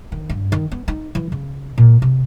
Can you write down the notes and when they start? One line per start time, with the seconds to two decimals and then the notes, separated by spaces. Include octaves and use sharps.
0.12 D#3
0.29 G2
0.52 D#3
0.72 B3
0.88 D#4
1.15 E3
1.32 C#3
1.78 A#2
2.02 C3